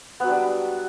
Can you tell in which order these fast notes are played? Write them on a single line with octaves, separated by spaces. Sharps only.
B3 F#3 D4 G3